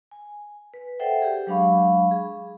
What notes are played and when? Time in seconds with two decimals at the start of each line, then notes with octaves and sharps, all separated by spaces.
0.11 G#5
0.74 B4
1.00 A4 C5 D5 E5 F#5 G5
1.22 G4 G#4
1.47 F#3 G#3 D4 F5 B5 C#6
2.11 G#4